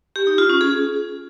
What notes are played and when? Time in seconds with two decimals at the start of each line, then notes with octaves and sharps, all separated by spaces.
0.16 G4
0.27 D#4
0.38 F4
0.50 C#4
0.61 G#4